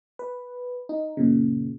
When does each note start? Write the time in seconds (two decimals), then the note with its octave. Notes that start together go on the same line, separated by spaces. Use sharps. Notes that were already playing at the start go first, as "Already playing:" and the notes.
0.19 B4
0.89 D#4
1.17 F#2 A#2 C#3